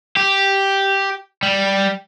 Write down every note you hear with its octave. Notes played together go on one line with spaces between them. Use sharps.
G4
G3